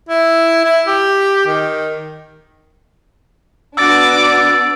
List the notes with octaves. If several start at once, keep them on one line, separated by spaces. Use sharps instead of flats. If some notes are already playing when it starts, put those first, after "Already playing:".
E4
E4
G4
D#3
B3 D4 F#4 D6 E6 A6 D7